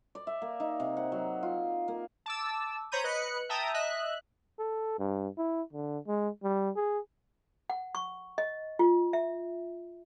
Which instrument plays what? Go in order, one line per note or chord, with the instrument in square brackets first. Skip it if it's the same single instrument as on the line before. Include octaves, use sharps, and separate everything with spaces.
[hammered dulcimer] D5
E5
A#3
D#4
C3
F#5
F#3
F4
A#3
[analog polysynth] A5 D6 E6
C5 C#5 A#5 B5 G6 D#7
B4 D#5 F#6 C#7
E5 G5 A5 A#5 D#6
D#5 E5 F#6
[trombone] A4
G2
E4
D3
G#3
G3
G#4
[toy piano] F#5
C#6
D#5
F4
E5